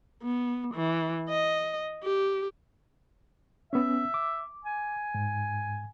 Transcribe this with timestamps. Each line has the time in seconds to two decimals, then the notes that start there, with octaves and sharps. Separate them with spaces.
0.23 B3
0.74 E3
1.29 D#5
2.03 G4
3.73 B3 C#4 E5
4.14 D6
4.65 G#5
5.15 G#2